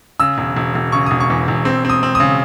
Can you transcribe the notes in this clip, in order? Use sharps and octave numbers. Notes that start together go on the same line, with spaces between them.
C#3 E6
E1
E1
E1
C#3 C#6
E1 D#6
C#6
E2
E1
C4
C4 D#6
C4
C#3 D#6